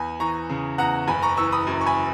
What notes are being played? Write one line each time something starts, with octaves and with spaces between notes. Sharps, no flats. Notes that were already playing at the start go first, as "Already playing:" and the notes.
Already playing: E2 G#5 B5
E3 A#5 C#6
C#3
E2 F#5 A#5
F#1 G#5 B5
A#5 C#6
E3 C#6 E6
B5 D#6
F#2
C#6
G#5 B5